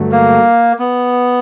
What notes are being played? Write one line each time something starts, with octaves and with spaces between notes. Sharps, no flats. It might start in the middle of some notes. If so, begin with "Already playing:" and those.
Already playing: G2 D3 F#3 A3
A#3
B3